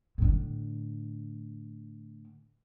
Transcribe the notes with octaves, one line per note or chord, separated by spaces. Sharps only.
A2 D3